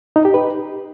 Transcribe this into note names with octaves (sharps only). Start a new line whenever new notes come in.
D#4
G4
B4